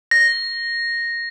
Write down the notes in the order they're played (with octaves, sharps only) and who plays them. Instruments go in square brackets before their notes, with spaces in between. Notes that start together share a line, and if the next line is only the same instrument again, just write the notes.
[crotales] A#6